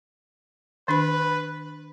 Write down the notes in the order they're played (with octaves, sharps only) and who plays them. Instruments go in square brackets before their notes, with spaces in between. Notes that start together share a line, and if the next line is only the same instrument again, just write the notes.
[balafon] D#3 D4 B5 [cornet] B4